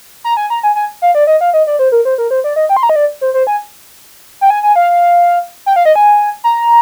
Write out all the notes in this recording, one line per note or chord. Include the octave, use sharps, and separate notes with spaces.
A#5
G#5
A#5
G#5
G#5
F5
D5
D#5
F5
D#5
D5
C5
A#4
C5
A#4
C5
D5
D#5
G5
C6
A#5
D#5
D5
C5
C5
G#5
G5
G#5
G#5
F5
G5
F5
D#5
G#5
A#5